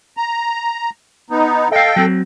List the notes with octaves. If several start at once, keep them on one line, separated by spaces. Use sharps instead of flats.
A#5
B3 D#4
A4 D#5 F5 G5
F#3 C4